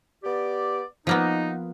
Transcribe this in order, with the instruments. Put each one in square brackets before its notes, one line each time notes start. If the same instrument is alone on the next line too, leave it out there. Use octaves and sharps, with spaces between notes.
[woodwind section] B3 G4 D5
[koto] F3 A#3 B3 [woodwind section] D#4